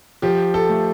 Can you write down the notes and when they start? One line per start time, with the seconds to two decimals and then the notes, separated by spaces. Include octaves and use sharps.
0.22 F3 G4
0.54 A4
0.69 A3